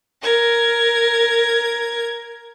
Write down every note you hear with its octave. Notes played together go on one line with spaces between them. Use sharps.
A#4 G#6